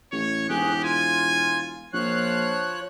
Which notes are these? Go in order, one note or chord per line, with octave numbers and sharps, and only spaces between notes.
A1 C#5
E1 G#2 G4 G#4 F#6
F4 G#5
A#1 F3 C#5 F5 F#6